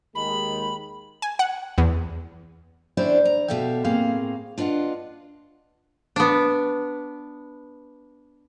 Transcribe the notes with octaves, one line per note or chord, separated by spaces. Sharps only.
D#2 D#3 G#3 B5
G#5
F#5
E2
C#4 D4 E4 G4 C5 D5
A#5
B2 G4 A4 E5 F5
A2 A#3 C4 G#4 F5
D4 F4 B4 D#5 F#5
B3 D4